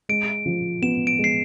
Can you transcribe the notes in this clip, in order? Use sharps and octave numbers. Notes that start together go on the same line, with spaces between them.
G#3 D7
F3
B3 E7
D7
G#3
C7